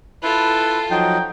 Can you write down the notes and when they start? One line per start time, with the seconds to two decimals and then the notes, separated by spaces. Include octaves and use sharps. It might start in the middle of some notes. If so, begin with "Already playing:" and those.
0.23 E4 F4 A4 B4
0.91 F3 F#3 D#4 G5